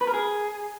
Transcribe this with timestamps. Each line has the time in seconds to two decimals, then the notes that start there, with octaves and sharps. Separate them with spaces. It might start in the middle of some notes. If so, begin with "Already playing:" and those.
0.01 B4
0.07 A#4
0.14 G#4